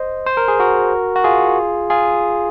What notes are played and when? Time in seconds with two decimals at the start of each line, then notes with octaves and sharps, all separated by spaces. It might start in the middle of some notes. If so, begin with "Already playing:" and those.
Already playing: C5 D#5
0.26 C5
0.37 A#4
0.48 G#4
0.60 F#4 A#4
1.16 F#4
1.24 F4 G#4
1.90 F4 G#4